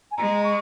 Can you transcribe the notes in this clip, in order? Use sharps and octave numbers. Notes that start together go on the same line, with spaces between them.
G#5
G#3 A#5
C#6